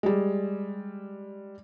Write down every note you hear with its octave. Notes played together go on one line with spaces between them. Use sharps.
G3 G#3